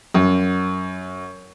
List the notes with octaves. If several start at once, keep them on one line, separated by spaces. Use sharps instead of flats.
F#2